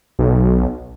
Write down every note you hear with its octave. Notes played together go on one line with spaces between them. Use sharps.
B1